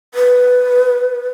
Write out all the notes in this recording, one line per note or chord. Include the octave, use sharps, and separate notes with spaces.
B4